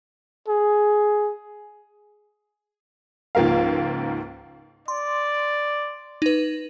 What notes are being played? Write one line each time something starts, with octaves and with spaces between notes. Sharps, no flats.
G#4
C#2 G#2 F3 A#3 A#4 F5
D5 C6
D#4 B4